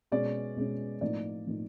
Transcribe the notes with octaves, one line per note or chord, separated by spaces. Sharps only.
B2 G#3 C#4 D5
B2 G#3 C#4
A2 F3 A#3 D#4 D5
A2 F3 A#3 D#4